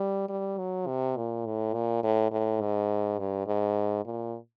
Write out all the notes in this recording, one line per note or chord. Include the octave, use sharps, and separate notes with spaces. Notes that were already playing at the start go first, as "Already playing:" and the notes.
Already playing: G3
G3
F#3
C3
A#2
A2
A#2
A2
A2
G#2
G2
G#2
A#2